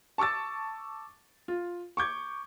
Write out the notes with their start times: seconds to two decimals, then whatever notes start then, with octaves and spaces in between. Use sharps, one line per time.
0.18 A5 C#6 D6 E6 A6
1.48 F4
1.97 C#6 D6 G6 G#6